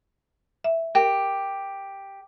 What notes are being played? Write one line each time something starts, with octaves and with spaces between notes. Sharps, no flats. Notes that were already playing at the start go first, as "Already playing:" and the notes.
E5
G4 A#4